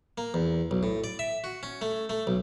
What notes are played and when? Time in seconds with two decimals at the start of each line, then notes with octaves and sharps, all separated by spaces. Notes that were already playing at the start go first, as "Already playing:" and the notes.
0.18 A#3
0.34 E2
0.71 B1
0.83 A2
1.04 D5
1.19 E5
1.44 F#4
1.63 C#4
1.82 A3
2.10 A3
2.27 B1